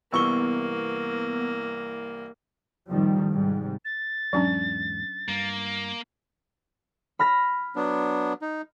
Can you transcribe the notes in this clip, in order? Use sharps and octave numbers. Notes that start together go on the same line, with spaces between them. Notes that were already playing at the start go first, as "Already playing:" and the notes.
C2 E3 A#3 B3 C#6 E6 G7
A1 F2 D#3 F3 G3
G#2 C3 G3
A6
E2 G#2 F#3 C#4 D4
G2 A#3
B5 F6 A#6
F#3 B3 D4
D#4